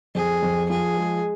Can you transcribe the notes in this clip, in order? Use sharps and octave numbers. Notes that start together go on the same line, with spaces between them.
F2 G#4
F2
F3 G#4
G#3